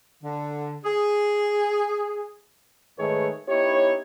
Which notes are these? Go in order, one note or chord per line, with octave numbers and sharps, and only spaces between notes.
D3
G#4
G#2 D#3 A3 G#4 B4 C#5
B3 D#4 E4 G4 C#5